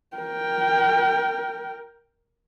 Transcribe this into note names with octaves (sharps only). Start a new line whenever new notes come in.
A#4 G5